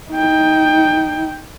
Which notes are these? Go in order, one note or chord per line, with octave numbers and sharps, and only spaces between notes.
D#4 G5